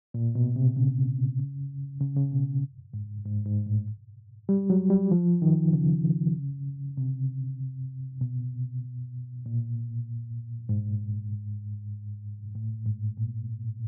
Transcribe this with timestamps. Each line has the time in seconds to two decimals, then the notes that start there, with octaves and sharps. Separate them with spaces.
0.14 A#2
0.35 B2
0.56 C3
0.76 C#3
2.01 C#3
2.16 C#3
2.32 B2
2.94 G#2
3.25 G#2
3.45 G#2
3.66 A2
4.49 G3
4.70 F#3
4.90 G3
5.12 F3
5.42 D#3
5.73 C#3
6.97 C3
8.21 B2
9.46 A#2
10.69 G#2
12.55 A2
12.86 G#2
13.17 A#2